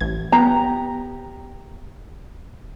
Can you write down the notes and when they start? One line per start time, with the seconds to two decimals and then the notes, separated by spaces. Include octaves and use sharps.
0.01 A1 G#6
0.32 B3 G4 A#5